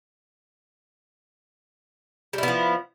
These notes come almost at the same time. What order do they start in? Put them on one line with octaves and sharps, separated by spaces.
G3 E4 B3 F3